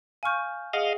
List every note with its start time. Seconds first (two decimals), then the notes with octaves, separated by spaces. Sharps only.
0.23 F5 G#5 C#6 F6 G6
0.73 G#4 D#5 F5 F#5